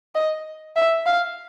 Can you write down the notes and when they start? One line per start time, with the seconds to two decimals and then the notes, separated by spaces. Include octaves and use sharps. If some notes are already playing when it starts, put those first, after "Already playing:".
0.15 D#5
0.76 E5
1.06 F5